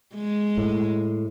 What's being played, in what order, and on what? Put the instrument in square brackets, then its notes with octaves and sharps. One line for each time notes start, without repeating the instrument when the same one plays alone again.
[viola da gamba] G#3
[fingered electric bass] A2